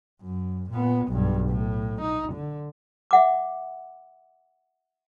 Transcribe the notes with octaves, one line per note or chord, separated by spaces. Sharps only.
F#2
A#2 B3
B1 G2
A2
D#4
D3
E5 F#5 D6